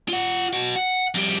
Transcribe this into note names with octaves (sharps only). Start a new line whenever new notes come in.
F4 F#5
B3 F#4
F#5
F2 G3